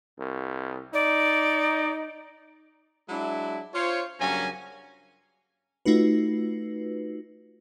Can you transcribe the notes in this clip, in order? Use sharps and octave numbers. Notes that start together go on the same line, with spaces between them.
C2
D#4 D5
F#3 G#3 D4 E4
F4 C5 C#5
G2 C#3 F#3 A#3 C#4 G#5
A3 D#4 F4 F#4 B4